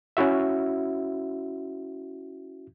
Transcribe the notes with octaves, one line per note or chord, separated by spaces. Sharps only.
C#4 E4 F#4 E5